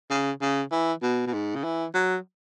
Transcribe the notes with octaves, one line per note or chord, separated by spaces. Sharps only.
C#3
C#3
E3
B2
B2
G#2
C#3
E3
F#3